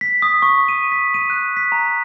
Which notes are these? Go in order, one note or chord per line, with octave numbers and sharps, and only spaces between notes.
B6
D#6
C#6
D#7
B6
D#7
F#6
B6
A#5